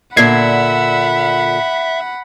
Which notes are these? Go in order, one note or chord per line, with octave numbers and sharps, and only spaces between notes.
A#2 D3 E5 F#5 B5 G#6 C7